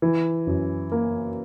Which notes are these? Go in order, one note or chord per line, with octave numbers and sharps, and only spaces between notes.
E3
F#2
A#3